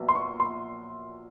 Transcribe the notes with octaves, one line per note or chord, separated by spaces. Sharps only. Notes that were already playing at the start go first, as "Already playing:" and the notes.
Already playing: A#1 A#2 F#3 B3
C6
C#6
C6